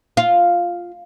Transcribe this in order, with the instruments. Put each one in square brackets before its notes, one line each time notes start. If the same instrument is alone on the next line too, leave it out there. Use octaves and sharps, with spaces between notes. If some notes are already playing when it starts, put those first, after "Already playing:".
[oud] F4